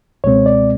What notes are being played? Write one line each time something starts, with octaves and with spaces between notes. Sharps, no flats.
C#2 B2 G#3 C4 C#5
D5